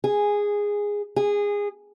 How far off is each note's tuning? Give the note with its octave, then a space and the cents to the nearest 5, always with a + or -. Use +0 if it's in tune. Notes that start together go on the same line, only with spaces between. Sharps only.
G#4 -10
G#4 -20